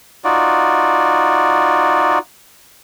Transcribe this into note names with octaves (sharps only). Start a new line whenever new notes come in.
D#4 F4 F#4 D5